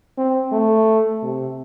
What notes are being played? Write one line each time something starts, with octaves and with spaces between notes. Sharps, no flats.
C4
A3
C3